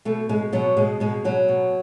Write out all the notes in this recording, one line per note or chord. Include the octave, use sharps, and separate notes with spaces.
B2 A3
B2 G#3
B2 F#3
B2 G#3
B2 G#3
B2 F#3
B2